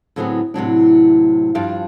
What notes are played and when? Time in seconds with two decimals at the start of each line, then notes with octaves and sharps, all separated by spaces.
0.16 A2 D3 F#3 B3 C4 G#4
0.54 A2 C3 F#3 D4
1.55 G2 F3 D4 G4 F5